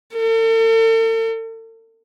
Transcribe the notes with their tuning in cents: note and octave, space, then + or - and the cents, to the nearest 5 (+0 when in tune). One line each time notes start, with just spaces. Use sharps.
A4 +45